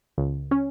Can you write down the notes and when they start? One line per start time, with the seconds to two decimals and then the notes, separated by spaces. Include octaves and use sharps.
0.18 C#2
0.51 C#4